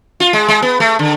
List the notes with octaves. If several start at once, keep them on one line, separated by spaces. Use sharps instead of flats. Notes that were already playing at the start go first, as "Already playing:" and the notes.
F4
G#3
G#3
B3
A3
D3